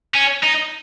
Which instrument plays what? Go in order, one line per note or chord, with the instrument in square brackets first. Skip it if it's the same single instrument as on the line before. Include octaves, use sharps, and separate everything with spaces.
[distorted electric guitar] C#4
D#4